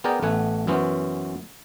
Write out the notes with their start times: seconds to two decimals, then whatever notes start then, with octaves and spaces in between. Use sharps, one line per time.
0.04 B3 G#4 A#4 D5 G5 A#5
0.22 A1 A3 B3 F#5 G#5
0.67 F#2 E3 B3 C#4 C5